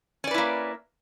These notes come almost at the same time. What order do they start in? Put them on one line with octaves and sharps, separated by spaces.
C#4 D5 B4 E4 A#3